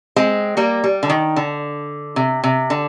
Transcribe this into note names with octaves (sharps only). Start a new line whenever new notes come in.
G#3 C4
G3 A#3
G3
D3
D#3
D3
C3
C3
D3